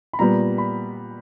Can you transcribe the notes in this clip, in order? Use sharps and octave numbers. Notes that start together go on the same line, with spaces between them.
B5
A#2 G3 B3 A#5
B5